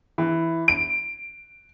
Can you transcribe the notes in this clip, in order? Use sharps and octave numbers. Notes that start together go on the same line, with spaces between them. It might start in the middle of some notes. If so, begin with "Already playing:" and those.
E3
D7